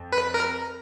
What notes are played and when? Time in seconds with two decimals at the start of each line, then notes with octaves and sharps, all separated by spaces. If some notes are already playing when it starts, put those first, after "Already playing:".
Already playing: F2
0.12 B4
0.34 A#4